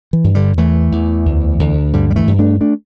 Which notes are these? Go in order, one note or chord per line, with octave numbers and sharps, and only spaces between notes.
E3
G2
D3 G3
E2 E3 A3
E2
D2
D2
G2 D3 G3
G3
E3 A3
G2
A3 D4
A3 D4